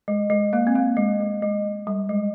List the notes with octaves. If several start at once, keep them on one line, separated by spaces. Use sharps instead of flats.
G#3
G#3
A#3
C4
A#3
G#3
G#3
G#3
G3
G#3